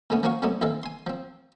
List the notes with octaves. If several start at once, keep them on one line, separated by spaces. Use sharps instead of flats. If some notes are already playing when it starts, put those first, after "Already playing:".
A#2 C#3 A3 B3 C#4
F3 A#3 C#4 F#4 F5 C#6
C3 F#3 A3 B3 C4 D4
A#1 D#3 E3 C4 A4 F5
G#5 C6
F3 C4